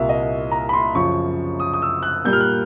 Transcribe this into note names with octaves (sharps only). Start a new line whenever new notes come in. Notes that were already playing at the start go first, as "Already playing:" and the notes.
Already playing: C2 A#2 G3 A#3 E5 F5
D#5
A#5
B5
C6
F#2 C#3 F3 C#6
D#6
D#6
E6
F#6
A#2 G3 A#3 G6
F6
F#6